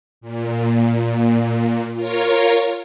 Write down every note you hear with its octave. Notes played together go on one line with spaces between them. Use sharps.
A#2
F4 A#4 C#5